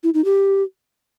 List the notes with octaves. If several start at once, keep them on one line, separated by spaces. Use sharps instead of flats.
E4
D#4
G4